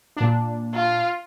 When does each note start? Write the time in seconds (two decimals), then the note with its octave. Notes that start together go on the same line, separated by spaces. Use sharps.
0.17 A#2 D4
0.74 F4